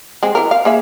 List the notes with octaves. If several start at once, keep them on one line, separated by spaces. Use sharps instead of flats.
G#3 C4
E3 A#4
F5
A#3 G#4 E5